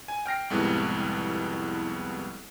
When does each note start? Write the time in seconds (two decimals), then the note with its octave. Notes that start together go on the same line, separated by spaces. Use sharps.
0.08 G#5
0.26 G5 F6 A#6 C7
0.50 C2 F2 A2 G3 G#3 B3